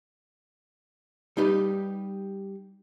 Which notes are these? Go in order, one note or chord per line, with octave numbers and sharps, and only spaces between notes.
G3 D#4 G4 B4